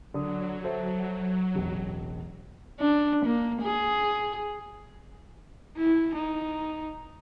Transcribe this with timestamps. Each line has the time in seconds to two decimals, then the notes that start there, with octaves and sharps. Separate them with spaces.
0.14 D3 F#3 D#6
0.64 A4 C5 E5
1.55 E1 A1
2.80 D4
3.25 A#3
3.62 G#4
5.77 E4
6.15 D#4